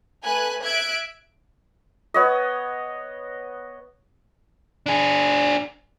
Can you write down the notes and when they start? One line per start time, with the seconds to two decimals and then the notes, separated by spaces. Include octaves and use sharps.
0.24 A3 B4 G#5 F#6
0.64 E5 F#6 G#6 D7
2.14 B3 C#5 D#5
4.86 D4 G#4